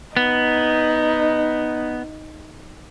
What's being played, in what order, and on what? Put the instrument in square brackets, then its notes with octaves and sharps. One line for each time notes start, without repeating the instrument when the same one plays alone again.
[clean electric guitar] B3 [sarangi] D#4